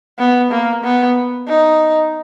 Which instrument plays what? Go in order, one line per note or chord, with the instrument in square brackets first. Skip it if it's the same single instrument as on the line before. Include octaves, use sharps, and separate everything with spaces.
[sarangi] B3
A#3
B3
D#4